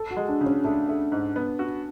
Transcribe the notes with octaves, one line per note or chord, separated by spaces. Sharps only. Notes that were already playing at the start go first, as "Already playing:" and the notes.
Already playing: A4
F#4
G#3
D4
C#3
C#4
A3 D4
A3
G#2
B3
F#4